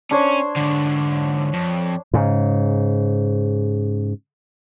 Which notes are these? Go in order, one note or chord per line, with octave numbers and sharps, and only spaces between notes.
C#4 D4 C5 C#5
G#2 D3
F2
G#2 C#3